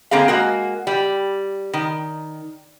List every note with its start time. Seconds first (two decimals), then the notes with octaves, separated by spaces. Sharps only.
0.11 D3 A#3 C4 G#4 F5
0.28 G#3 A#3 F#4
0.87 G3
1.74 D#3